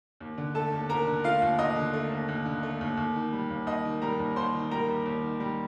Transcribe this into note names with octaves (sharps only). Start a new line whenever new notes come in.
D#2
D3
A3 A4 A5
D#2
D#2 A#4 A#5
D3
A3 F4 F5
D#2
D#2 D#5
D3
A3
D#2
D#2
D3
A3
D#2
D#2
D#3
G3
D#2
D#2 D#5
D#3
G3 A#4 A#5
D#2
D#2 C5 C6
D#3
G3 A#4 A#5
D#2
D#2
D#3
G3